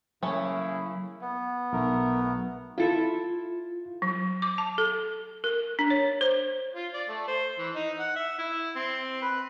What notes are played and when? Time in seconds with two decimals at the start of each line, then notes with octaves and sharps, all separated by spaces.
0.23 C#3 F#3 A3 A#3 C#4 E4 C#5
1.21 B3
1.73 B1 A3 A#4
2.78 E4 F4 A4 E5
4.02 F#3
4.42 D6
4.58 A5
4.78 A4
5.44 A#4
5.79 D4
5.90 C#5
6.21 C5
6.75 F4
6.93 D5
7.09 A3
7.28 C5
7.59 E3
7.75 D#4
7.99 F#5
8.16 E5
8.39 E4
8.76 C4
9.22 B4